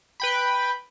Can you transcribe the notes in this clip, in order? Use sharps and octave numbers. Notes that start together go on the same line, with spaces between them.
B4 G5 B5